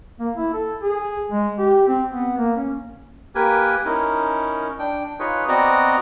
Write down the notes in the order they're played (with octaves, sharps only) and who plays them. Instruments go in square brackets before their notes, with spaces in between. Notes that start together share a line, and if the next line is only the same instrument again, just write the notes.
[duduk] A#3
E4
A4
G#4
G#3
G4
C4
B3
A#3
C#4
[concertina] A#3 G4 A#4 B4 G#5
C#4 D#4 E4 A#4
D4 G5
D#4 F4 G#4 B4 C#5
B3 C4 F#4 D5 D#5 A#5